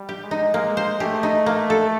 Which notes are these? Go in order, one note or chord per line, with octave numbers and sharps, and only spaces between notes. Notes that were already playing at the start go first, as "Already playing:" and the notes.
Already playing: G3
G4
G#3
D#4
G#3 A#3
C5
A3 G4
D#4
A#3
A4